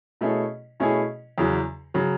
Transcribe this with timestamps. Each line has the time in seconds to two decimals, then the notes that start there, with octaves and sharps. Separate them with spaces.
0.21 B2 A3 C#4 E4 G#4
0.80 B2 A3 C#4 E4 G#4
1.38 E2 C#3 F#3
1.94 C#3 F#3